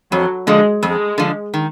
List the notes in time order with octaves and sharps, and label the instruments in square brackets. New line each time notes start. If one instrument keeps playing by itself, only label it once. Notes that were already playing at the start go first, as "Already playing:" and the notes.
[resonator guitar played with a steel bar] F2 [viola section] F#3
[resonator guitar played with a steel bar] D3 F3 [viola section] G#3
[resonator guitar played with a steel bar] F2 [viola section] G#3
[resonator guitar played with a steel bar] D3 F3
D#3